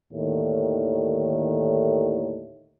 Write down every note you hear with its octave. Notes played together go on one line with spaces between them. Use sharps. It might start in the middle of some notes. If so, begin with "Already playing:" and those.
D#2 A2 D3 D#3